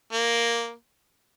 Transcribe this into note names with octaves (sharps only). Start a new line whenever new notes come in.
A#3